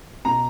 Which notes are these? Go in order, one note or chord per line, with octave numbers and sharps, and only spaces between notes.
B2 A#5